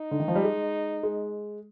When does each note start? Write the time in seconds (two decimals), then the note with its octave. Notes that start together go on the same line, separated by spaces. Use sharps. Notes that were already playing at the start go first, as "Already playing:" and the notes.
Already playing: D#4
0.11 D3
0.20 D#3
0.28 F3
0.35 G3
0.43 G#3
1.03 G#3